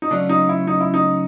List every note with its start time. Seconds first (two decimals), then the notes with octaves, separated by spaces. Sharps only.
0.02 D#4
0.11 C#3 F#3 A3 C#4 D4 F4
0.29 D#4
0.49 E4
0.67 D#4
0.80 E4
0.94 D#4